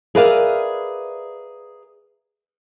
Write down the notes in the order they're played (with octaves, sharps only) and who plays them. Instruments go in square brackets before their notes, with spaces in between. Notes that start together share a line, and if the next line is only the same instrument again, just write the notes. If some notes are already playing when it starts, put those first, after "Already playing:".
[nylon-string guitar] G#4 A#4 B4 D5 E5 F5